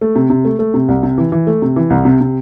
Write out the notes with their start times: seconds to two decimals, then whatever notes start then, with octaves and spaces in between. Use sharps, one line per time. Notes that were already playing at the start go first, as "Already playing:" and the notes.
0.01 A3
0.15 C3
0.30 C3
0.45 A3
0.59 A3
0.74 C3
0.88 C2
1.03 C3
1.18 E3
1.32 E3
1.47 A3
1.62 C3
1.76 E3
1.90 C2
2.05 C3
2.21 C3